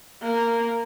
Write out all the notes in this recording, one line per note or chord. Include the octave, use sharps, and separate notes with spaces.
A#3